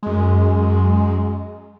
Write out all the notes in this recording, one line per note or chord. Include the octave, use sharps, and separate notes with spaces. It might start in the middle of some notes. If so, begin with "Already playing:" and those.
F#2 G#3